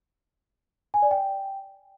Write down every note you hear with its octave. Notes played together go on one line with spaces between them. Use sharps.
G#5
D5
G5